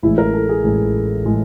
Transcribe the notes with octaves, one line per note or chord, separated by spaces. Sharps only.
A1 A2 E3 G#3 E4
A#4
A4
G#4
A1 A2 E3 G#3
A2 E3 G#3